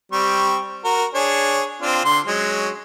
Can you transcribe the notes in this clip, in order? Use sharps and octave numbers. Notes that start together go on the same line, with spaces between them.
G3 C4 C#6
F#4 A#4
D4 G#4 C#5
C4 D4 F4
D3 C6
F#3 G#3 C#4